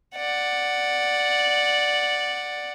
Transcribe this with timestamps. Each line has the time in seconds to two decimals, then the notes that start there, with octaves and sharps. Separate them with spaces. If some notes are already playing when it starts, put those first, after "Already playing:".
0.16 D5 F#5